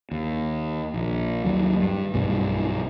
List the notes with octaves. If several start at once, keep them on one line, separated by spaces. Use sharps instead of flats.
D#2
A#1
D#2 F#3
G2
B1 G2 C3